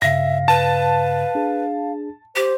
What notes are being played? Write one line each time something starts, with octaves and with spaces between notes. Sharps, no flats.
G2 C#3 E5 F5 A#6
B4 A5
D4 G#4
G4 C5